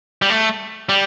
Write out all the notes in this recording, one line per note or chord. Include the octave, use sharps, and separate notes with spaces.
G3
A3
G3